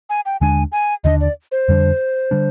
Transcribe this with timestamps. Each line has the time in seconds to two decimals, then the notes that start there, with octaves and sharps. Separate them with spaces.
0.10 G#5
0.26 G5
0.41 D#2 D3 G#3 D4 G#5
0.72 G#5
1.04 D#2 D3 G#3 D4 D#5
1.21 D5
1.52 C5
1.68 F2 D3 G3 D4
2.31 D3 G3 D4